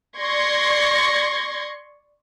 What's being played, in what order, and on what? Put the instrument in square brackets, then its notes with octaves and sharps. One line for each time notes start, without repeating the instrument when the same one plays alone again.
[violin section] D5 C6 C#6 G#6 A#6